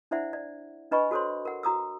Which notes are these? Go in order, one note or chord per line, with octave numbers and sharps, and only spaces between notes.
D4 E4 C5 D5 E5 F#5
D5
D4 B4 D#5 G#5 B5 C#6
F#4 A4 C5 C#5 C6
A#4 F#5
F#4 A#5 D#6 E6